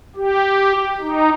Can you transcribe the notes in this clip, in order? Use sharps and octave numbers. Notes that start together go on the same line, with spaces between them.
G4
D#4